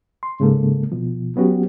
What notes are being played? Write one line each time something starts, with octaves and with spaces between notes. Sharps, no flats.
C6
G#2 C#3 G#3 A#3 A4
B2 F3
F#3 B3 C#4 F#4 G4